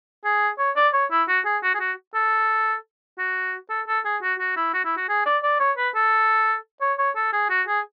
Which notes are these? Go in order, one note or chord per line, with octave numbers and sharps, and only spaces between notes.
G#4
C#5
D5
C#5
E4
F#4
G#4
F#4
G#4
F#4
A4
F#4
A4
A4
G#4
F#4
F#4
E4
F#4
E4
F#4
G#4
D5
D5
C#5
B4
A4
C#5
C#5
A4
G#4
F#4
G#4